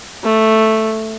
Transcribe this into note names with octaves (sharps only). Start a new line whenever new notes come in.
A3